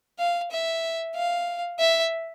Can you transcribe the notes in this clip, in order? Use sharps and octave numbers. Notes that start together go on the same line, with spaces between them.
F5
E5
F5
E5